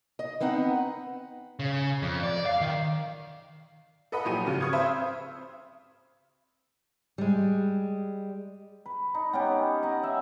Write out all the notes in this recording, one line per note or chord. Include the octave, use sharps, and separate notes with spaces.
D#5
B3 C4 D#4 F#5
C#3
F2
D5
F5
D#3
A4 B4 D#5 F#5 B5
A#2 F3 F#3 G4 D#7
G#1 C#3 F#4
C#6 D#6 F6 G#6
C4 C5 E5 B5
G3 G#3
B4
D4 D#4
B3 C#4 G4
D#4 D#5 F#5 G#5
E5